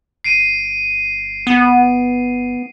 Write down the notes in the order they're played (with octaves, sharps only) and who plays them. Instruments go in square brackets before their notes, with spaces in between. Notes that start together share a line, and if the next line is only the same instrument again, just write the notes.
[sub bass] G1 [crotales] C7 D7 D#7
[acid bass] B3